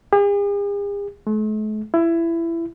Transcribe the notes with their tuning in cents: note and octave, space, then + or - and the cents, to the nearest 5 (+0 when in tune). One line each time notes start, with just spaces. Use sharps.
G#4 -45
A3 -45
E4 +20